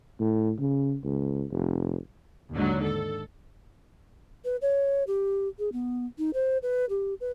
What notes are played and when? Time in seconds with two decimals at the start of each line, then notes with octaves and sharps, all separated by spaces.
0.20 A2
0.59 C#3
1.04 C#2
1.51 F1
2.53 D#2 G#2 D3 F#3
2.83 A4
4.45 B4
4.62 C#5
5.07 G4
5.59 G#4
5.73 B3
6.18 D#4
6.34 C5
6.63 B4
6.90 G4
7.21 B4